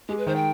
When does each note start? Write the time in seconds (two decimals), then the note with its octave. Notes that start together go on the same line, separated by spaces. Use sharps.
0.08 G#3 G4
0.18 B4
0.26 D#3 C5
0.35 G5